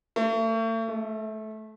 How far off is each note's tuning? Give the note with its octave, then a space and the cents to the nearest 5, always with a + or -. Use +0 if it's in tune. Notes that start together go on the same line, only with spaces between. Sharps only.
A3 +40
A3 -20